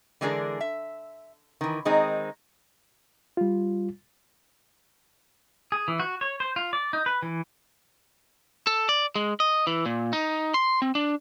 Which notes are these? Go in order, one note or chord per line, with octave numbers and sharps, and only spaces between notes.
D3 E3 G#3 D4 G#4 A#4
E5
D#3 E3
D#3 G#3 C4 D#4
G3 F4
G#4
E3
F#4
C#5
C5
F4
D5
D#4
B4
E3
A4
D5
G#3
D#5
E3
A#2
D#4
C6
C4
D4